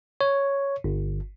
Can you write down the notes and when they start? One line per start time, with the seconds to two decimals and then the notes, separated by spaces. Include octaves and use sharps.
0.21 C#5
0.84 G1